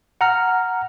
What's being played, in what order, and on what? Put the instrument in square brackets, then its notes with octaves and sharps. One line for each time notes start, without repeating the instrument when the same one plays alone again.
[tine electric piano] F#5 A#5 F6